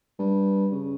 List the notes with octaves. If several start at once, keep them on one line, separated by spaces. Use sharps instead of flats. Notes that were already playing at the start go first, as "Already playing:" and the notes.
G2
C#3